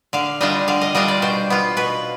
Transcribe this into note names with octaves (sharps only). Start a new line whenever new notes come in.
D3 F5
G3 D4 F4 D#5
D3 F5
D#5
G3 D4 F4 D#5
D5
B2 C5
B3 F4
B2 B4